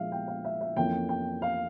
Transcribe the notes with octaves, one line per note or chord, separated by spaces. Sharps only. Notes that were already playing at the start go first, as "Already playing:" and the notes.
Already playing: A#1 A#2 F3 G#3 E5 F5
G5
F5
E5
E5
F2 E3 A#3 C#4 G5
G5
F5